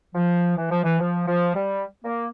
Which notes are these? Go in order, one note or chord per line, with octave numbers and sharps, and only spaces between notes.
F3
E3
F3
E3
F3
F3
G3
A#3